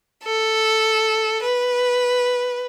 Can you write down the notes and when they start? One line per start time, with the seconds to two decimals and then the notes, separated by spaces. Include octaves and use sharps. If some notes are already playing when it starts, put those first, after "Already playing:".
0.24 A4
1.42 B4